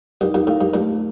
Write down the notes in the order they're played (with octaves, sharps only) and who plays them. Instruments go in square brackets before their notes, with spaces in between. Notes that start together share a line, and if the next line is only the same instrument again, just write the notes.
[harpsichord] G2 A#2 [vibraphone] D#4
[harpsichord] G2 A#2
[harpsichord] A2 [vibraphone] A#4 F5
[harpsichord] G2
[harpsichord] G2 A#2 [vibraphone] A3